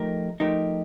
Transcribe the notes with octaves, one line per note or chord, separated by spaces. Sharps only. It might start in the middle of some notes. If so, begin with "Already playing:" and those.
Already playing: F3 A3 D#4 G4 A#4
F3 A3 D#4 G4 A#4